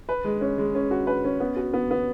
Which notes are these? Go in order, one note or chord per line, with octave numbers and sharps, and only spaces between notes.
B4
G#3
C#4
G#3
C#4
F#4
B4
C#4
B3
F#4
B3
B3